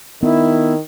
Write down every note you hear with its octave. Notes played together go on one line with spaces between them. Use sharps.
D#3 B3 E4